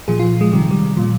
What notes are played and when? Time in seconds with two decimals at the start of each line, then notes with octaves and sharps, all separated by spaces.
0.08 A#2 F3 G#4
0.19 F4
0.41 G#3
0.53 C3 D#3 G3
0.71 G3
0.97 A#2 F3